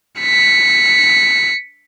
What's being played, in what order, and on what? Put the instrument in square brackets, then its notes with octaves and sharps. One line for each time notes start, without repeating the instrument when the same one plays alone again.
[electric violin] B6 C#7